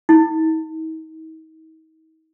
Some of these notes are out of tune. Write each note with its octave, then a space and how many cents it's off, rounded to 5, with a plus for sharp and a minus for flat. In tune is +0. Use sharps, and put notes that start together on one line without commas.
D#4 +40